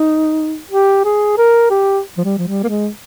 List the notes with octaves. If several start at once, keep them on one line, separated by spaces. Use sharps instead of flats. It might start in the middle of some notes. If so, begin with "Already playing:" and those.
Already playing: D#4
G4
G#4
A#4
G4
F3
G3
F3
G3
A#3
G#3